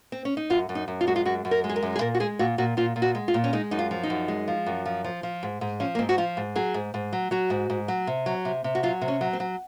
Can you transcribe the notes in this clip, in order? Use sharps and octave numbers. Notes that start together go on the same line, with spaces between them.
C4
C#4
D#4
F#2 F4
F#2
D#4
F#2
F4
G#3 F#4
F4
F#2 F#4
F#2
A#4
G#3
G#4
A#4
F#2
G#4
A#2 A#4
F#4
G#3 G#4
A#2 F#4
A#2 F#4
A#2 F4
A#2
F#4
G#3
F4
A#2
C#4
G#3 D#4
F#2 D#4
F4
F3
D#4
F#2
G#3
F3
F#2
F3
F3
F3
G#2
G#2
F3 C#4
A#3
G#2 C4
F#4
F3 F4
G#2
F#3 G#4
G#2
G#2
F#3
F#3 F#4
G#2
G#2
F#3
C3
F#3
C3
C3
F#4
F#3 F4
C3
C#4
F#3
C4
F#3